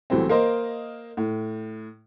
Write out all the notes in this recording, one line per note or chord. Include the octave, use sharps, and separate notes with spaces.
C2 B2 E3 F#3 A3 C4
A#3 A#4 C5 D#5
A2